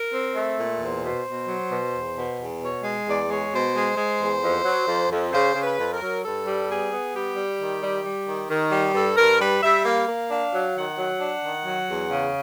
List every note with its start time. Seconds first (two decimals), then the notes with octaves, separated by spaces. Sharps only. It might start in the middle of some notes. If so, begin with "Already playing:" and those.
Already playing: A#4
0.12 C4
0.35 A3
0.58 A#2
0.81 E2 C5
1.03 B2
1.26 B2
1.48 F#3
1.71 B2
1.94 E2
2.17 B2
2.39 E2
2.61 B2 C#5
2.84 G#3
3.07 E2 D5
3.29 G#3 C#5
3.52 B2 C5
3.75 G#3
3.98 G#3
4.20 E2
4.42 F2
4.65 F#3
4.88 F2
5.11 F2
5.33 C#3 C5
5.55 C#3
5.63 B4
5.79 F2
5.93 A#4
6.00 F#3
6.24 G2 A4
6.45 G3
6.68 B3 G#4
6.92 B3
7.13 G3 G4
7.36 G3
7.59 D#3
7.82 G3
8.05 G3
8.27 D#3
8.49 D#3
8.72 G3
8.94 G2 A4
9.17 G2 A#4
9.39 G3 B4
9.62 G3 E5
9.85 A#3 F5
10.08 A#3
10.30 D4 F5
10.53 F#3
10.75 D#3 F#5
10.98 F#3
11.21 D4
11.43 D#3
11.66 F#3
11.88 E2
12.11 C#3